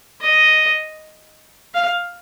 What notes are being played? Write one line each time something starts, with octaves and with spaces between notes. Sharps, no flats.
D#5
F5